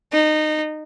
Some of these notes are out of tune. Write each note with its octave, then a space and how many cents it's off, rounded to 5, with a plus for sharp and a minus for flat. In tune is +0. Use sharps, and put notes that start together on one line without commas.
D#4 -20